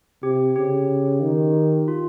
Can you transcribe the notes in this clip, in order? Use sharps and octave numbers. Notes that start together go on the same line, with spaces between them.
C3 G4
C#3 G4
D#3
F4